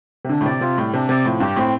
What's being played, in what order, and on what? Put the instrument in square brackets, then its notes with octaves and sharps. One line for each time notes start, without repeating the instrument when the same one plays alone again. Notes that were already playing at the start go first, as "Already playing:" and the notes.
[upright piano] C3
[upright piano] D3 [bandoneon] D4
[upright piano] A2
[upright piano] C3 [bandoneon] D5
[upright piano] C3 [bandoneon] F4
[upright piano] A2 [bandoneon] G3
[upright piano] C3 [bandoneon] D4
[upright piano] C3 [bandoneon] D5
[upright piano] A2 [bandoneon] F3
[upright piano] G2 [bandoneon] G4
[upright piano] A2 [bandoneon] C4